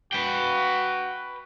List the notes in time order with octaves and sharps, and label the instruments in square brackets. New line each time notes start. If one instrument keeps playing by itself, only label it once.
[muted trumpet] F#4 [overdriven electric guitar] B4 G5